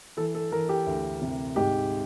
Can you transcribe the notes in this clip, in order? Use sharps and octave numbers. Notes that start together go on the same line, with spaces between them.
E3 A4
A4
E3 A#4
G4
D2
C3
G#2 G4